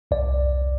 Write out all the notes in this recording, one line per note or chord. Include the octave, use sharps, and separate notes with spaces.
C2 D5